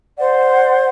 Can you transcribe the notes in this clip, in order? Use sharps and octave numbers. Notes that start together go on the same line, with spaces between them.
C5 D5 F#5